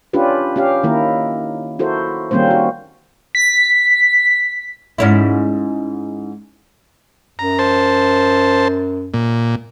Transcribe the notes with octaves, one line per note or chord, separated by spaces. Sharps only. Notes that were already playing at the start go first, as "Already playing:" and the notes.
C#4 D4 F4 G4 B4
C#4 G4 F5
D#3 A#3 E4 A#4
E4 F#4 A4 A#4 C5
D#3 G3 A#3 C4 C#4 C5
F#4
B6
G#2 C#4 E4
F#2 A#5
C5 A5
A#2